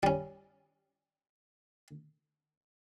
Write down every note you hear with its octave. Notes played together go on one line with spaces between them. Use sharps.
G3 C#4